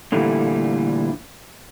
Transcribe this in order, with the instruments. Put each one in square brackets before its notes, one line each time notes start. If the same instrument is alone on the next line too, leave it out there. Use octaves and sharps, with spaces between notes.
[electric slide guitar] A#2 D3 E3 G3 A3